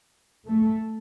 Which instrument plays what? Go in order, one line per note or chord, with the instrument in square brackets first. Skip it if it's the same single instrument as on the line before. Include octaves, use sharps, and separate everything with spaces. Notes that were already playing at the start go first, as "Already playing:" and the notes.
[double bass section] A3